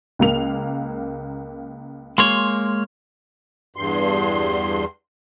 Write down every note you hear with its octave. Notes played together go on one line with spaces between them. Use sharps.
C#2 A#3 F7
G#3 A#3 C#5 C6
E2 G2 C6